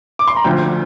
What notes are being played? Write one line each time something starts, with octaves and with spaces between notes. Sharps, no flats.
D6
C6
A#5
D2 D3 F3 G5